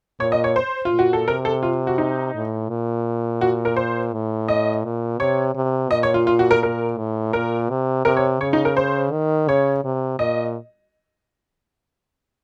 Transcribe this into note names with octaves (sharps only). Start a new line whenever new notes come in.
A#2 C#5
D#5
C#5
C5
F4
A#2
F#4
A4
C3 A#4
A4
F4
F#4
D#4
A2
A#2
F#4
A#4
C5
A2
D#5
A#2
C3 C#5
C3
A#2 D#5
C#5
F4
F4
F#4
A#4
A#4
A2
A#2 A#4
C3
C3 A#4
C#5
C#3 C#5
D#4
A#4
C5
D#3
C#3 C#5
C3
A#2 D#5